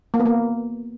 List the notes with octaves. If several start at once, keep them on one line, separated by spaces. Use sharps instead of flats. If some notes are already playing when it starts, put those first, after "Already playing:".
A#3
B3
A#3